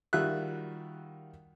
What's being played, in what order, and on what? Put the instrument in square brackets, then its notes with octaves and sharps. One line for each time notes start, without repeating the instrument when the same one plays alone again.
[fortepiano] D#3 G3 F4 F#4 E5 F#6